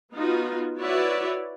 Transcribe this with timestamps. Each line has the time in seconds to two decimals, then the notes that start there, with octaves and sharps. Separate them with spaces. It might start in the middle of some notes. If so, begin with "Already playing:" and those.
0.13 B3 D#4 F4 F#4
0.79 E4 F#4 B4 C#5 D5 E5